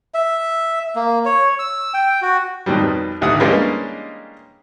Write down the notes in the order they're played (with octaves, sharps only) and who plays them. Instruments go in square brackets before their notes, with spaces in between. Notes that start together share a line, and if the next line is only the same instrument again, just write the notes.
[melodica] E5
A#3
C#5
E6
G5
F#4
[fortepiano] F2 B2 D#3 F#3 G3
G#1 D2 F#5 D#6
E3 G3 G#3 A#3 C#4 D4